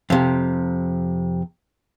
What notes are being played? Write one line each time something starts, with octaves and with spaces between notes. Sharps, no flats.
F2 C3